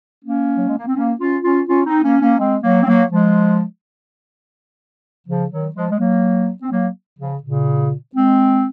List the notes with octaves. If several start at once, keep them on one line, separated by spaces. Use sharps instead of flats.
A#3 C#4
F#3
G#3
A#3
C4
A#3 C#4
C#4 F4
C#4 F4
C#4 F4
C4 D#4
A#3 C#4
A#3 C#4
G#3 C4
F#3 A#3
C4
F#3 A#3
F3 G#3
C#3 F3
D#3 F#3
F3 G#3
G#3
F#3 A#3
C4
F#3 A#3
C#3 F3
A#2 C#3
G#3 C4